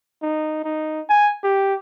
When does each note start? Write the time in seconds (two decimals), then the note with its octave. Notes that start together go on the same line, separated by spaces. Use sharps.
0.22 D#4
0.64 D#4
1.10 G#5
1.44 G4